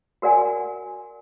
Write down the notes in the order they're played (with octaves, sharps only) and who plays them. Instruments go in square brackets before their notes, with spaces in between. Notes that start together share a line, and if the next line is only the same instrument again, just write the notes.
[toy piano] F#4 A#4 D5 F#5 G#5